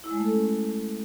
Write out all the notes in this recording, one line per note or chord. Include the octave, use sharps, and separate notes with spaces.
E4
G#3
A3
A4
C#4